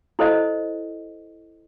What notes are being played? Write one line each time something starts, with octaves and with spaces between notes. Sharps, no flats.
E4 A4 C5 D#5